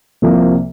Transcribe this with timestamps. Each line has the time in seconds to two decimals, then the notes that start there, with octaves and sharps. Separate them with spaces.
0.22 C2 C3 F3 A#3